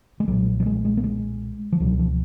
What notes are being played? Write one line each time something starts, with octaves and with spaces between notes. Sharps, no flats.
G#3
B1 A#2 F#3
F#3
G#3
G#3
A#3
G#3
F3
C#2 B2 F#3
F3